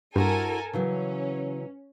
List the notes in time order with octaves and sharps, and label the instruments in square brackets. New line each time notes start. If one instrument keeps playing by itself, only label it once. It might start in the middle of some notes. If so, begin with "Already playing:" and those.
[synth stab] G2 [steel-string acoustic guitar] E4 F#4 C5 [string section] A4 A#4 G#5
[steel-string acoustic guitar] C#3 E3 F#3 [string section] C#4